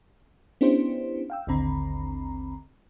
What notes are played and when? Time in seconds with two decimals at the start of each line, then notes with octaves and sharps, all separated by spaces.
0.61 B3 C#4 D4 E4 G4 C5
1.30 F5 G5 E6
1.47 A1 D#2 D3 C4 A#5 B5